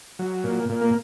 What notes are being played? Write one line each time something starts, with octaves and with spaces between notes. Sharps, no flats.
F#3
A#2
A#2
A#3